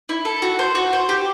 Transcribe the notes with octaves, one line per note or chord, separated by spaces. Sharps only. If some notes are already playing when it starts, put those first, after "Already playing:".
E4
A4
F#4
C5
F#4
C5
G4